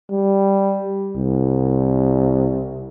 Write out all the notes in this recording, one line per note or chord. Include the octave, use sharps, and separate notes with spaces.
G3
C2